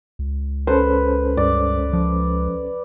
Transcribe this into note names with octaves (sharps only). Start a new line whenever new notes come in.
C#2
C#4 A4 B4 C5
G2 D5
F3